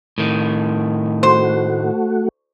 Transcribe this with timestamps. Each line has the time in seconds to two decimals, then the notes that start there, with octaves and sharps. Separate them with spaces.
0.18 A2 D#3
1.23 A3 F#4 C5